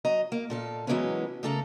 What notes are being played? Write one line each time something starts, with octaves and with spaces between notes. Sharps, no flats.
F#3 D#5 A#5
A#3
A#2 A4 F5
E3 F#3 G#3 A#3 B3 C#4
C#3 A3 A#3 A4 A#5